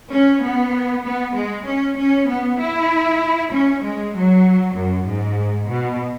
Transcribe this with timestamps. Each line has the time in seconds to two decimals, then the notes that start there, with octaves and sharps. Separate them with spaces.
0.11 C#4
0.43 B3
1.04 B3
1.35 G#3
1.66 C#4
1.97 C#4
2.29 B3
2.59 E4
3.52 C#4
3.83 G#3
4.15 F#3
4.76 F#2
5.07 G#2
5.69 B2